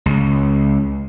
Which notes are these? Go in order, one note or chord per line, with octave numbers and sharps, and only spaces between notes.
C#2